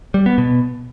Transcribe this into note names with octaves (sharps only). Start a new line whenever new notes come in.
G3
B3
B2